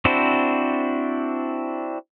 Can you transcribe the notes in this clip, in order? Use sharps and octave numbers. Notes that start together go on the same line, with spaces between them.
C4 D4 E4 F#4 C5